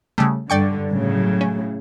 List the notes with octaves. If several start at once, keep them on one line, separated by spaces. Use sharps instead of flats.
C#3 G3 A3
G2 D3 D5 G5 C#6
A2 C#3 F#3
C#4